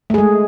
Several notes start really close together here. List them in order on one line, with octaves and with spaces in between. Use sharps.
A3 G#4 G#3